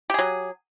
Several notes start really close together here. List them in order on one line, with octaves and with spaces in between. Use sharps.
G4 G#4 F#3